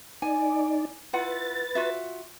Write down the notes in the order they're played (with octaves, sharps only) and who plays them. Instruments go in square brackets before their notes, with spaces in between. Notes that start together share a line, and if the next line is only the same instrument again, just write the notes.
[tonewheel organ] D#4 D5 [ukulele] G#5
[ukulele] E4 F4 F#5 [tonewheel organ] B4 A6
[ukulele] F4 F#4 E5